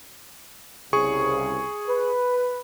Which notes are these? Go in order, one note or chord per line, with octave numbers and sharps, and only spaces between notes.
C2 C#3 G#4 C#6
B4